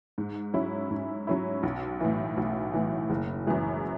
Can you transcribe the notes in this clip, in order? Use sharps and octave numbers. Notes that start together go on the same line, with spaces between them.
G#2
F#3 C#4 E4
G#2
F#3 C#4 E4
B1
A2 E3
B1
A2 E3
F#1
F#2 E3 G#3